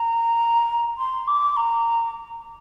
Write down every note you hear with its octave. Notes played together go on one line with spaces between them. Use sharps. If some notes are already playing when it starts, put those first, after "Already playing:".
Already playing: A#5
C6
D6
A#5